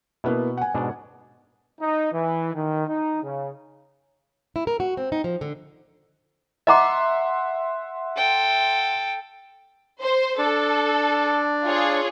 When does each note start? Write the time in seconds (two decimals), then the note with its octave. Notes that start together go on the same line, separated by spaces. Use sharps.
0.24 B2 A#3 B3 E4
0.57 F#5 G#5
0.74 G#2 B2 D4
1.80 D#4
2.13 E3
2.54 D#3
2.87 D#4
3.23 C#3
4.56 E4
4.67 A#4
4.80 F#4
4.97 C4
5.12 D#4
5.24 F3
5.41 D3
6.67 D#5 E5 F#5 A#5 C6 D6
8.17 A4 G5
10.00 C5
10.38 D4 A4
11.63 F4 G#4 C#5